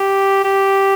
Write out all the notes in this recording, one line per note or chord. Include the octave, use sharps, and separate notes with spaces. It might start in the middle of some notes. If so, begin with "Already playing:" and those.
Already playing: G4
G4